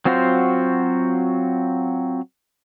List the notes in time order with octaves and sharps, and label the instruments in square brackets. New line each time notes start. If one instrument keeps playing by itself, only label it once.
[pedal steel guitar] F#3 C4 F4 F#4 C5